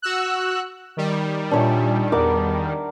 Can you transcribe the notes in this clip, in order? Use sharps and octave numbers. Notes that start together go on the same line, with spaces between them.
F#4 E6 F#6
D#3 G3
A#2 D4 C#5 E5
E2 A#4 F#5 D6